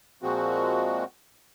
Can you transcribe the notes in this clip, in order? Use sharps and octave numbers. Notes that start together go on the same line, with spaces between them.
A#2 F3 G#3 C4 F#4